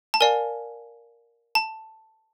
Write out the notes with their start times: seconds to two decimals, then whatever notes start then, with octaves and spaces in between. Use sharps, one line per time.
0.14 A5
0.20 A#4 D5 F5 G#5
1.55 A5